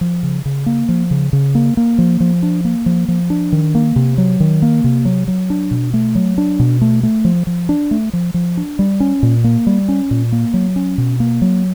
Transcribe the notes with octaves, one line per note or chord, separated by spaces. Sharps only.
F3
C#3
C#3
A#3
F3
C#3
C#3
A#3
A#3
F3
F3
D4
A#3
F3
F3
D4
D#3
A#3
C3
F#3
D#3
A#3
C3
F#3
F#3
D4
B2
A3
F#3
D4
B2
A3
A3
F3
F3
D4
A3
F3
F3
D4
G3
C#4
A#2
A#3
G3
C#4
A#2
A#3
F#3
C#4
B2
A#3
F#3